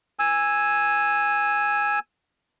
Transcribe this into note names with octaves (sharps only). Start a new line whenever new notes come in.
G#5 E6